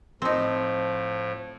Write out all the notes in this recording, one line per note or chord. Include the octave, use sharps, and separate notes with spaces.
A2 F3 C4 D#4